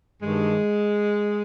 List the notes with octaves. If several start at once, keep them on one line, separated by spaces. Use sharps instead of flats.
G2 D#3 G#3